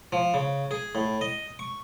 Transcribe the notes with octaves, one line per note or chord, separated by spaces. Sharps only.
F3
C#3
G#4
A2
D#5
C#6